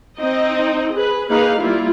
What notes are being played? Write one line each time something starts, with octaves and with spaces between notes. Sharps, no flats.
C4 D#4 D#5
G#4 B4
A#3 D#4 G#4 B4 F5
G3 A#3 E4 F4